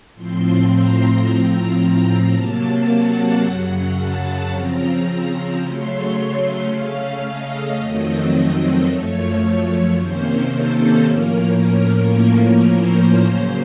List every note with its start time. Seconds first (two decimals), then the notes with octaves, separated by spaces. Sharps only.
0.15 A2 F3 C4 C6
0.69 A#5
1.24 A2 F3 C4
1.79 A#5
2.33 C3 F#3 A#3 A5
2.87 F#5
3.41 F#2 C#3 F#3
3.96 A5
4.50 C#3 F3 C4 A#5
5.60 C#3 F#3 A3 C#4 C6
6.69 C#3 A3 C#4 F5
7.24 D#5
7.78 F2 D#3 F#3 A3 C4
8.86 F#2 F3 A3 C#5
9.95 C3 D#3 A#3 C#4 C5
10.50 A4
11.05 A2 F3 A#3 C#4 A#4
12.14 A2 F3 A#3 C#4
12.68 C5
13.22 C#3 F#3 A#3 C#4 C5